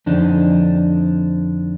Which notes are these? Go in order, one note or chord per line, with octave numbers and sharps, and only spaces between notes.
F2 D3 D4 D#4